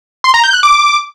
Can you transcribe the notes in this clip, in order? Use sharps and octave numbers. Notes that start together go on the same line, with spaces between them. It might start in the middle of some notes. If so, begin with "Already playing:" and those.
C6
A#5
G6
F#6
D6